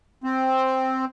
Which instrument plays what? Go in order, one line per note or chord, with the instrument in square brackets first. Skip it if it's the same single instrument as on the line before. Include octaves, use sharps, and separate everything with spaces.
[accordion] C4